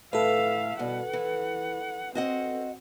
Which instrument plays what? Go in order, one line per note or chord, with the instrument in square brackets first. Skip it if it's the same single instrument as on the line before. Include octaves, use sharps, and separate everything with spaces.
[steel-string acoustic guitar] A2 [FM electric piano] A4 B4 [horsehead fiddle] E5 F5
[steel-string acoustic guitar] G2 B2 [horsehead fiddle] F#5
[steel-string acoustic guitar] E3
[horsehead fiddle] C4 [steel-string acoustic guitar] F#4 D#5 F#5